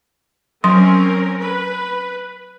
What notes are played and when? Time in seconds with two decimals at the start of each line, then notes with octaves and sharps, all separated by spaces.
0.64 F#3 C4 C#4 A#4 C6
1.41 B4